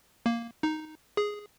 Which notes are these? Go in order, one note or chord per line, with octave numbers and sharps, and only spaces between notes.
A#3
D#4
G#4